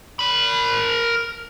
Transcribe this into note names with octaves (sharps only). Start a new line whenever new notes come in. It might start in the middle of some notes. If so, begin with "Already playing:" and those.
A#4 B5